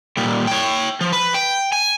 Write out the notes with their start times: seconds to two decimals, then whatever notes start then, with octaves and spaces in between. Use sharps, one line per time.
0.17 A#2 G3
0.47 C#5 G5
1.01 F3
1.13 B4
1.34 G5
1.72 G#5